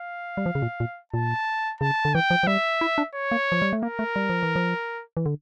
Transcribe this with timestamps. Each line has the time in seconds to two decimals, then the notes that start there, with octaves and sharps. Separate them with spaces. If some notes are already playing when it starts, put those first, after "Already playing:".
Already playing: F5
0.37 G3
0.46 F3
0.55 C#3
0.62 A#2
0.80 A#2
1.13 A#2 A5
1.81 C#3 A5
2.05 D3
2.14 E3 G5
2.30 F3
2.43 F3
2.47 G3 E5
2.81 E4
2.98 D4
3.15 C#5
3.32 A#3
3.52 F3
3.62 G3
3.73 A3
3.82 A#3 A#4
3.99 A3
4.16 G3
4.30 F3
4.43 E3
4.56 F3
5.17 E3
5.26 D3